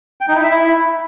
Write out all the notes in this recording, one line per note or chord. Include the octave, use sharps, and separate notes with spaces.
G5
D#4
E4
E5
E4